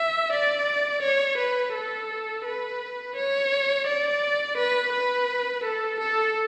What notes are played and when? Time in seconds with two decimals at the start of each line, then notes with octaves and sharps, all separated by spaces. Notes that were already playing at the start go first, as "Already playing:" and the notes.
Already playing: E5
0.32 D5
1.03 C#5
1.38 B4
1.74 A4
2.45 B4
3.15 C#5
3.87 D5
4.57 B4
4.93 B4
5.63 A4
6.00 A4